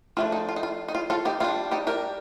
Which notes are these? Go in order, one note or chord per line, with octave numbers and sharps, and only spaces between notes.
F3 A3 D4 F4
D#4
F4
D#4
F4
D#4
F4
F4 A4
D#4 G4
G3 D4 F4
D#4 G4
G4 A#4